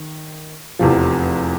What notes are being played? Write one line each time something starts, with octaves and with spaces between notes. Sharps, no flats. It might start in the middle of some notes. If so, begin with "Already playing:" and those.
Already playing: D#3
F1 E2 C3 F3